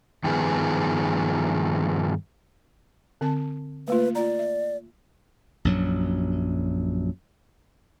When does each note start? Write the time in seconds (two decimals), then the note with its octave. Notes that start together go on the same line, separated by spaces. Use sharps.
0.24 G2 D#3 F3 B3 G#4
3.21 D3 C4 A5
3.88 A3 A#3 F4 B4
4.15 F4 D5 A#5
4.39 E5
5.65 A#1 F#2 F#3